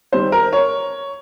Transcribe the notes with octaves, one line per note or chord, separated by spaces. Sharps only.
D#3 G3 C4 C5
A#4
C#5